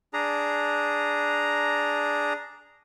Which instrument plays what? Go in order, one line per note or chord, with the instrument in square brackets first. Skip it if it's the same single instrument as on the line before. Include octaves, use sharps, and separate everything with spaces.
[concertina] D4 G#4 A#5